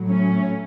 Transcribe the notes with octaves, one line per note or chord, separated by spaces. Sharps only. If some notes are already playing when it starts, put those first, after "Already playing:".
Already playing: A2 F#3
A3 C#4